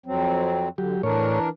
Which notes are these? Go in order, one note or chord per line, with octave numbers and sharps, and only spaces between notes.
F2 F#3 C4
D3 F#3 G4
A2 E3 D4 A#4 C#5